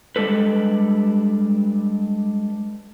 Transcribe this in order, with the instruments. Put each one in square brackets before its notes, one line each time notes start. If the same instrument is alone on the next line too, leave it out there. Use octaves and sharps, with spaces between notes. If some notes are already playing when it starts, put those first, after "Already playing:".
[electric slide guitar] G3 G#3 D4 A4 B4